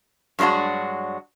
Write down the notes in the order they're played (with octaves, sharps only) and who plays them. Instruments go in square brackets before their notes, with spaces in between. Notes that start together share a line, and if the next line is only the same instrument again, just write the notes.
[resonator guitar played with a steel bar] G2 F#3 G#3 D4 F#4